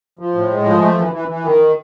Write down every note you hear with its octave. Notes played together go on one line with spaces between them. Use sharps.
F3
A2
G#3
F3
A3
E3
E3
E3
D#3